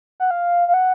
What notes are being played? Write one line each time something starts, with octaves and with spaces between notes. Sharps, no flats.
F#5
F5
F5
F#5